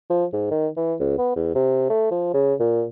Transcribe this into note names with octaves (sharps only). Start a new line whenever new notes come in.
F3
G#2
D#3
E3
C#2
B3
E2
C3
A3
F3
C#3
A#2